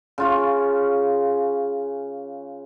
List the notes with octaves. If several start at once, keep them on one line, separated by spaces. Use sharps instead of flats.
C#3 F4 C#5